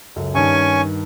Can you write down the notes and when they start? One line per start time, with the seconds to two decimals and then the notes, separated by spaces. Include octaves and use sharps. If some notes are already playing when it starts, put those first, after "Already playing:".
0.16 C#2 F#2 A4
0.35 G2 D#3 C#4 G#5 C#6